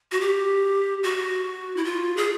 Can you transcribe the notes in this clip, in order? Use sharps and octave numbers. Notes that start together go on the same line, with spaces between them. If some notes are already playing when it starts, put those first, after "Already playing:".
F#4
G4
F#4
E4
F4
G#4